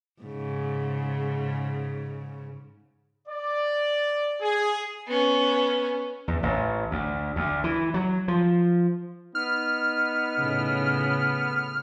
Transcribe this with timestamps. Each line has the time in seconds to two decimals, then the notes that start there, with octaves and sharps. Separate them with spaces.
0.22 G#2 C#3
3.27 D5
4.41 G#4
5.07 B3 C#4
6.28 E2
6.43 A1
6.91 D2
7.36 D2
7.64 E3
7.94 F#3
8.28 F3
9.35 B3 D#4 F6
10.38 A2 C#3